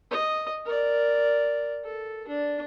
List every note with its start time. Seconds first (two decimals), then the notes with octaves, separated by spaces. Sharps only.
0.11 D#5
0.65 A#4 D5
1.84 A4
2.28 D4